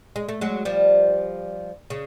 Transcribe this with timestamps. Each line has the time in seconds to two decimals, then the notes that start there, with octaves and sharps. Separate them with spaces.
0.16 G#3
0.29 A3
0.41 F#3 G#3
0.65 F3 G3
1.90 C#3